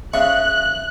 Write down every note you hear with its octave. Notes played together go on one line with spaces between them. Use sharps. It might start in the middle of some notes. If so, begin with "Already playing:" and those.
C#3 E5 C#6 F#6